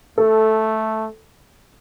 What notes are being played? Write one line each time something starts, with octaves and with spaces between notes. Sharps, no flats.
A3 A4